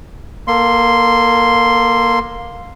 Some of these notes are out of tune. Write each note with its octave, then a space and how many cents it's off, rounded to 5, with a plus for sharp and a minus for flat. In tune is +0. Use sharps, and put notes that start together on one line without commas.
A#3 +15 A4 +35 C6 +0